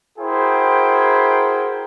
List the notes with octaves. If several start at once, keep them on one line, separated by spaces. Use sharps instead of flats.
E4 F#4 G#4 A#4 C5 G5